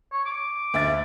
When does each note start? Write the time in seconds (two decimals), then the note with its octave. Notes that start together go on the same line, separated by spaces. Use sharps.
0.12 C#5
0.26 D6
0.74 D2 E5 A6